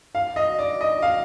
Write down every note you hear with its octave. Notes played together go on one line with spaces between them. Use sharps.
F5
D#5
D5
D#5
F5